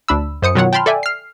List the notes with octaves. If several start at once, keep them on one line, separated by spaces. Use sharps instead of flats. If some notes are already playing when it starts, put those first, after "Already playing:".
D2 D4 B5 E6
F#2 C5 D#6 C#7
B2 D#3 F#3 F4 C#5 F#5
G5 A5 B5 C6 F6
A4 D5 E5 G5 G#5
F6 C7